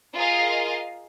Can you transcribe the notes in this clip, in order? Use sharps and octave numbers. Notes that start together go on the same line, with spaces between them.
F4 G#4 A#4 D#5 F5